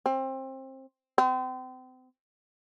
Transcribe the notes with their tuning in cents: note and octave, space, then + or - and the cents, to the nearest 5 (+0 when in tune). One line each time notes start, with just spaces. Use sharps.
C4 +25
C4 -35